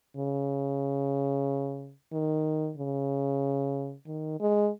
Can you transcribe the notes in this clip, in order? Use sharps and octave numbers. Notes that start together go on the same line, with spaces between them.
C#3
D#3
C#3
D#3
G#3